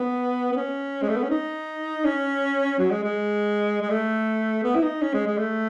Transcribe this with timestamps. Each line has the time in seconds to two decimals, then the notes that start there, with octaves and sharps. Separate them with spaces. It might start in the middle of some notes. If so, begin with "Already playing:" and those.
Already playing: B3
0.52 B3
0.56 C#4
1.02 G#3
1.09 A3
1.16 B3
1.23 C#4
1.30 D#4
2.05 C#4
2.79 F#3
2.91 G#3
3.03 G#3
3.82 G#3
3.90 A3
4.64 B3
4.75 E4
4.83 D#4
5.01 C#4
5.13 G#3
5.26 G#3
5.38 A3